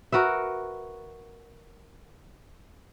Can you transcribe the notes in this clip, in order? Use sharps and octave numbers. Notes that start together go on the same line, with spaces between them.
F#4 A#4 B4 E5